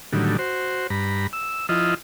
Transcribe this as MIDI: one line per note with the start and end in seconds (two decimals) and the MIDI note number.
0.13 0.37 45
0.13 0.37 50
0.13 0.37 51
0.13 0.37 54
0.13 0.37 55
0.39 0.87 66
0.39 0.87 72
0.90 1.27 43
0.90 1.27 82
0.90 1.27 83
1.33 1.66 88
1.69 1.94 53
1.69 1.94 64
1.69 1.94 65
1.69 1.94 75